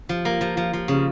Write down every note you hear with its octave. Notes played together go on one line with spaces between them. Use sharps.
F3
A#3
F3
F3
F3
C#3